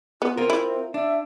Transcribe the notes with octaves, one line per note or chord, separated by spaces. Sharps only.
B3 F4
C4 F4 A#4
E4
D4 E5